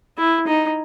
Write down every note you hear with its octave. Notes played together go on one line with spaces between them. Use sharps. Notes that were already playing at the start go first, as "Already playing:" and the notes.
E4
D#4